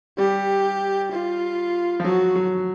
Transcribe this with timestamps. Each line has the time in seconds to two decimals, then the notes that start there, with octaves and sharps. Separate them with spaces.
0.18 G3 G4
1.11 F4
2.00 F3
2.04 F#3 F#4
2.35 F#3